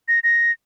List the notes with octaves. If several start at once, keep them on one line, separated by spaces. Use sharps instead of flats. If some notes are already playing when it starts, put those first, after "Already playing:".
A#6
A#6